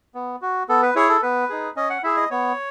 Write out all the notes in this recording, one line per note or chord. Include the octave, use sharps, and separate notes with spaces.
B3
F#4
B3 A4
B4
E4 G#4 C#5
A4
B3 B4
D#4 G#4
C#4 D#5
F#5
E4 G#4 E5
D#5
B3 C#5